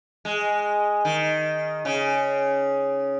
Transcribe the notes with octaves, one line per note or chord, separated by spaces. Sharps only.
G#3
D#3
C#3